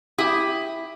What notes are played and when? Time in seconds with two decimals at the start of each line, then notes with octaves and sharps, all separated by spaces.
0.18 E4 G4 D#6